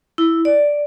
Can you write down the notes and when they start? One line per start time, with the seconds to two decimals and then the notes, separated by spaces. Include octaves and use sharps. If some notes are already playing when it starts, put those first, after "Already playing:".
0.18 E4
0.45 D5